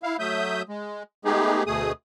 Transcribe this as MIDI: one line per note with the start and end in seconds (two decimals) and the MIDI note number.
0.03 0.17 64
0.03 0.17 77
0.19 0.62 54
0.19 0.62 57
0.19 0.62 76
0.19 0.62 87
0.19 0.62 91
0.69 1.03 56
1.25 1.63 56
1.25 1.63 57
1.25 1.63 59
1.25 1.63 63
1.25 1.63 67
1.25 1.63 68
1.66 1.92 38
1.66 1.92 47
1.66 1.92 57
1.66 1.92 68
1.66 1.92 87